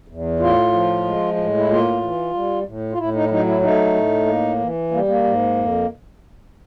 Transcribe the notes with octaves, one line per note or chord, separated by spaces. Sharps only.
E2
A2 F4
F3
G#3
A2
E4
A#3 F4
E3
G3
A2
F4
A2 E4
D#4
E4
F#3 D#4
E4
A3 D#4
A2
A#3
E3
G3 A#3
A#3
G#2
F2